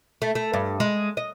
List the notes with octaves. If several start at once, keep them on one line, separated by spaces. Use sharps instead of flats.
A3
A3
G2
G#3
D#5